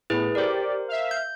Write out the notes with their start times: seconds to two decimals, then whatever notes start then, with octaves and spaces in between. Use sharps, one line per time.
0.10 A2 B3 E4 G#4 B4
0.35 G4 A#4 C5 D5
0.88 E5 F5
1.11 G6